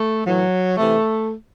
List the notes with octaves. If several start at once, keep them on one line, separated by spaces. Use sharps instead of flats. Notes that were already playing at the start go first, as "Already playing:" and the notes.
Already playing: A3
A2 E3 F#3
C3 E3 A3